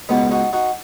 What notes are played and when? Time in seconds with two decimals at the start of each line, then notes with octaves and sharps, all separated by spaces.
0.09 C#2 B2 B3 D#4
0.31 D#4 F#4
0.53 D#4 F#4